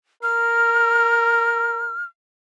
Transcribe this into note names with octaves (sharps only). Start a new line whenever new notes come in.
A#4 F6